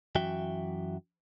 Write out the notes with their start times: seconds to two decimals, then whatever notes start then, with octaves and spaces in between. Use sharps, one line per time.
0.15 F#2 E3 F#4 E5 G5